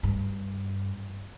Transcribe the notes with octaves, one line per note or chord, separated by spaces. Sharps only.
G2